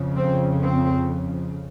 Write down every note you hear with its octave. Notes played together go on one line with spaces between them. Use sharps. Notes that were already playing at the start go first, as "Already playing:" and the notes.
Already playing: F2 C#3
C4
C4